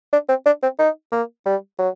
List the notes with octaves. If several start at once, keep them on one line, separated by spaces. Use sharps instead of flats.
D4
C4
D4
C4
D#4
A#3
G3
F#3